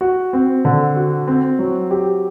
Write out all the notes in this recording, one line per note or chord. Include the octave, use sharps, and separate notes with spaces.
F#4
C4
D3
F#4
C4
F#3
G4